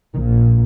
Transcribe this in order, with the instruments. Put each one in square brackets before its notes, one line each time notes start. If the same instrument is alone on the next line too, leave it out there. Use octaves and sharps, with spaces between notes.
[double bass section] A#1 A#2 D#3